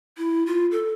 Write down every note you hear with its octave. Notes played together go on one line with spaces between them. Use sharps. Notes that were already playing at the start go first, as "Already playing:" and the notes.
E4
F4
A4